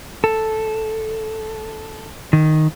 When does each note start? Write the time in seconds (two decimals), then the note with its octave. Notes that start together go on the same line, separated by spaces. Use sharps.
0.24 A4
2.33 D#3